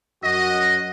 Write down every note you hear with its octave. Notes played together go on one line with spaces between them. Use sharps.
F#2 F#4 D#5